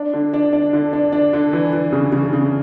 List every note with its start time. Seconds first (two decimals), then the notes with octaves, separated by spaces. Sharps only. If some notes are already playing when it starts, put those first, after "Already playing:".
Already playing: D4
0.14 D3
0.34 D4
0.53 D4
0.73 D3
0.93 D4
1.12 D4
1.33 D3
1.53 E3
1.73 E3
1.93 C#3
2.12 C#3
2.33 C#3